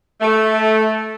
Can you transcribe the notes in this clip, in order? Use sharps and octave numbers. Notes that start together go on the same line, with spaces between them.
A3